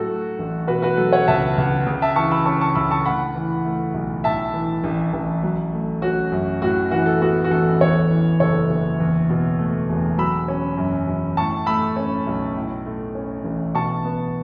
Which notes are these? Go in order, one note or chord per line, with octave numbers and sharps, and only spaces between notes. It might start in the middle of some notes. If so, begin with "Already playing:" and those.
Already playing: A2 F#3 F#4 A4
A3
A1
B2 F#4 B4
F#4 B4
F#3 A4
C#5 F#5
C#2 E5 A5
C#2
C#3
E5 A5
E3 A5 C#6
B5 E6
C#4 A5 C#6
A5 C#6
C#2 B5 E6
A5 C#6
A2 F#5 B5
E3
A3
B1
A2 E5 A5
E3
A1
A1
F#3
A3
C#4 F#4
F#2
A2 F#4
E3 F#4
A4
B3 F#4
F#4
A1 A4
E2 A4 C#5
E3
F#1 A4 C#5
F#1
E2
B2
A3
E1
F#3 B5 E6
C#4
F#2
F#2
A2 A5 C#6
A3 B5 E6
C#4
B1
A2
A3
C#4
A1
B2 A5 C#6
B3